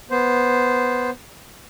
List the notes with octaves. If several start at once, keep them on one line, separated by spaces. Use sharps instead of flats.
B3 C5